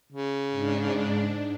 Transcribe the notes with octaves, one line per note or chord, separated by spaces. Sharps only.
C#3
G#2 D4